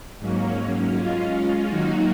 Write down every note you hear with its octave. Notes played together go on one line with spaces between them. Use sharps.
G#2 F#3 A#3 C#4
G#3 C#4 F4
D#3 F#3 A#3 D#4 F#4